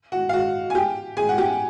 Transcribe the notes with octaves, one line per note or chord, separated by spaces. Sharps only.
F#4 F#5
F5
F#4 F#5
G#5
G4 G5
G#4 G#5
F#5
G4 G5